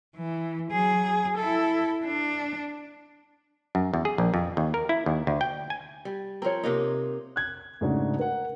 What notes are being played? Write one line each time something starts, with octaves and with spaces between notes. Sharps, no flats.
E3
F#3 G#4
E4 A4
D4
F#2
E2
G#4
A#1
F2
D#2
A#4
E4
D#2
D2
G5
G#5
G3
F3 C4 A#4 C#5
C3 A#3 D#4
F#6 G#6
G#2 C#3 A3 D4 F#4
A#4 F#5